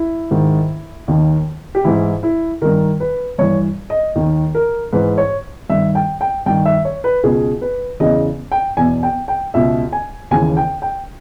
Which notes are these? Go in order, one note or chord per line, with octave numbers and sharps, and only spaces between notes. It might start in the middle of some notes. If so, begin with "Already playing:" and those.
Already playing: E4
G#2 D#3
D#2 D#3
G4
G#2 E3 E4
E4
G2 D#3 A#4
B4
G2 E3 C#5
D#5
D#2 D#3
A#4
G#2 E3 B4
C#5
G2 D#3 E5
G5
G5
G2 D#3 G5
E5
C#5
B4
C#2 B2 G#4
B4
E2 C#3 E3 D#5
G5
E2 B2 G#5
G5
G5
C#2 B2 E5
G#5
D#2 C#3 E3 G#5
G5
G5